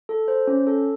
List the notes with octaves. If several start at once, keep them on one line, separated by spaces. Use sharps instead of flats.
A4
C5
C#4
A4